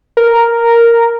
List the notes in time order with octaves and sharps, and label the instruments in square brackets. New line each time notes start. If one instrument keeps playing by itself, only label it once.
[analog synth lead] A#4